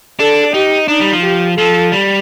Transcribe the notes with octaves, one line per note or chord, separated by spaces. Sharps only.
D4 A4
D#4 G4
D4 D#4
G3
F3
G4
F3 A4
G3